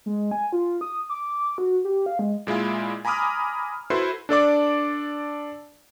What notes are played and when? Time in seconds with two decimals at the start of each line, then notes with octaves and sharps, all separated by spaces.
0.06 G#3
0.31 G#5
0.53 F4
0.81 D#6
1.10 D6
1.58 F#4
1.85 G4
2.06 F5
2.19 G#3
2.47 A#2 G#3 E4 F4
3.05 G#5 A#5 B5 D6 D#6 F6
3.90 E4 F#4 A4 B4 C5 C6
4.29 D4 A4 D5 D6